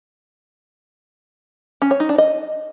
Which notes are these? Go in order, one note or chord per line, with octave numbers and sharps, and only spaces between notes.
C#4
C#5
D#4
D4
D#5